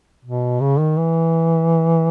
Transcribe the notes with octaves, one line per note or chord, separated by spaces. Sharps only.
B2
C#3
D#3
E3